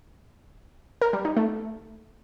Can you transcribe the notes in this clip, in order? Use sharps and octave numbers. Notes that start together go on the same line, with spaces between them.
A#4
G3
D#4
A3